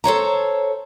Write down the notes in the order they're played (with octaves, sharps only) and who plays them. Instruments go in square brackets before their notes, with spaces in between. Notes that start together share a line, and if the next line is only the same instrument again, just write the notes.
[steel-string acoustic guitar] A4 C5 C#5 A#5